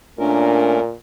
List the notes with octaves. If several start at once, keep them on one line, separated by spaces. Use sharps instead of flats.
A#2 A3 C#4 D4 A#4